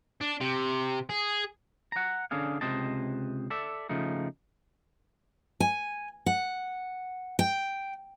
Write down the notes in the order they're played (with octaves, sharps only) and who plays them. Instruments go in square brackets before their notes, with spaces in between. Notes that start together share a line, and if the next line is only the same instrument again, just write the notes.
[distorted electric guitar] D4
C3
G#4
[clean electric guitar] F#5 A#5
D3 C#4 D4 G#4 F5
C#2 C3 C5 D#5 A5
A4 D5 E5
C#3 F3 A3 D#4
[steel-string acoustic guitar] G#5
F#5
G5